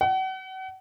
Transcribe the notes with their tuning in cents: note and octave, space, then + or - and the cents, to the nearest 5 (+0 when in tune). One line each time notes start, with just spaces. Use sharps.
F#5 +40